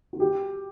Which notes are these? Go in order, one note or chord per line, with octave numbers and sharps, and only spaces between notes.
F#4
G4